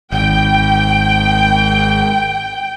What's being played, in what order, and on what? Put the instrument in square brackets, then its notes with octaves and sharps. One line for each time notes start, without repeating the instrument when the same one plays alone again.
[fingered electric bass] G#1 [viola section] G5